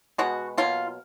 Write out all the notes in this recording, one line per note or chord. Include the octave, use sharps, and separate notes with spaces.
B2 G#3 B3 F#4
B2 F#3 A#3 F4